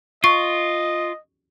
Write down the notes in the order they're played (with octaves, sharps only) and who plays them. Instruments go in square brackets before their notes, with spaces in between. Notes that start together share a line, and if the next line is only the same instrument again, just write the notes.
[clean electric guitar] F4 [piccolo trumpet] D#5 [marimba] C#6